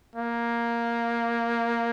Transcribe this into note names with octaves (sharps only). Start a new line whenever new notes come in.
A#3